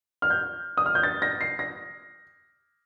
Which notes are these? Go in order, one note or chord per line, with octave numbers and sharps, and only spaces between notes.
F6
G6
D#6
F6
G6
A6
A#6
C7
A#6